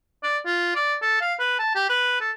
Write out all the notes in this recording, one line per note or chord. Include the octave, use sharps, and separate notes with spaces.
D5
F4
D5
A4
F5
B4
A5
G4
B4
A4